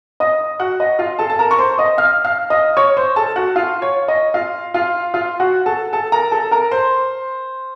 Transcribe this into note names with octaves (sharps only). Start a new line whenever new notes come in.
D#5 D#6
F#4 F#5
D#5
F4 F5
A4 A5
A5
A#4 A#5
C#6
C5 C6
D#5 D#6
F5 F6
F5 F6
D#5 D#6
C#5 C#6
C5 C6
A4 A5
F#4 F#5
F4 F5
C#5
D#5
F4 F5
F4 F5
F4 F5
F#4 F#5
A4 A5
A4 A5
A#4 A#5
A4 A5
A#4 A#5
C5 C6